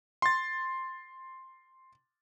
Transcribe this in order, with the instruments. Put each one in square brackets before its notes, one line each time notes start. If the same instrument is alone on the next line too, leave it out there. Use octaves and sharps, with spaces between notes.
[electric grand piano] C6 A6